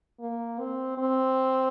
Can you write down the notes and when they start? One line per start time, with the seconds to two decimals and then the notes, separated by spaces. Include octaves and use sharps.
0.20 A#3
0.60 C4
0.98 C4